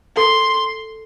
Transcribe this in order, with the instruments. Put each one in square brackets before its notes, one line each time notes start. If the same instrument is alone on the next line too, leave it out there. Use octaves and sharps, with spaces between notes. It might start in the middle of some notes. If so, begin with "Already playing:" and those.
[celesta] A4 [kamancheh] C6